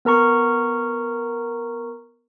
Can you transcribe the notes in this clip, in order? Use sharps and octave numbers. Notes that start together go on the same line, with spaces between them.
B3 A#4 A#5 C#6